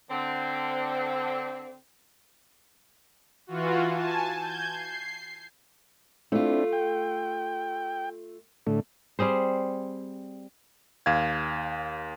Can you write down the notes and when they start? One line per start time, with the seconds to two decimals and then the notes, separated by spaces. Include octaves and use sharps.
0.10 D3 C4
3.47 E3 F4 F#4
3.92 G#5 A5
4.38 G6 G#6
4.72 C7
6.32 A3 C4 D4 E4 F4
6.73 G5
8.67 A2 D3 A3
9.19 G3 C4 G#4 C5
11.06 D#2 F5 G#6